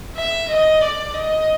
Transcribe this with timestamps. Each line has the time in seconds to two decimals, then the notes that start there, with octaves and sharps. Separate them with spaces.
0.16 E5
0.48 D#5
0.81 D5
1.14 D#5